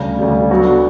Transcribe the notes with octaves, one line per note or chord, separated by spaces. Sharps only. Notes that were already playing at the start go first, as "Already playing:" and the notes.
Already playing: D2 C#3 G3
D2 C#3 G3
F#3 B3 D4 F#4 A4